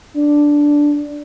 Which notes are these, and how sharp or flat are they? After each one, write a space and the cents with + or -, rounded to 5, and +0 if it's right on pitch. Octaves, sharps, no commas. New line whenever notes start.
D4 -5